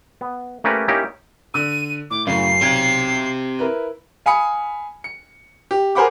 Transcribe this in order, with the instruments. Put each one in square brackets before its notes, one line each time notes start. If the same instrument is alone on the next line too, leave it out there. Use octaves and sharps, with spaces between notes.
[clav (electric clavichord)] B3
A3 A#3 C#4 G4 A#4 B4
A#3 C#4 D#4 E4 G4 A#4
[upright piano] D3 E6 [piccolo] D#7
[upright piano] A2 [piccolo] D6
[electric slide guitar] F#2 [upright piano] A2 C#3 [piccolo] C7
[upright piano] B1 G#6 [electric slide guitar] C4 G4
[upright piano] E4 A#4 B4
[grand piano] F5 G#5 B5 D#6 C#7
C#7
G4
G#4 A#4 C5 F#5 B5 D6